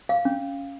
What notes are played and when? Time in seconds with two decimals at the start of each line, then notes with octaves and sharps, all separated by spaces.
0.09 F5
0.25 C#4